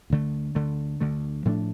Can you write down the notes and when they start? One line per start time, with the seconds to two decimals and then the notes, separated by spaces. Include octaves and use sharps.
0.10 D2 D3 A3
0.55 D2 D3 A3
1.01 D2 D3 A3
1.45 A2 F3 A3 D4